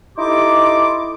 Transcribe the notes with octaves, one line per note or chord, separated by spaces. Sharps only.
D#4 E4 G4 A4 C6 D6